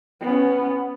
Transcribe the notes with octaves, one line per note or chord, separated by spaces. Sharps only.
B3 C#4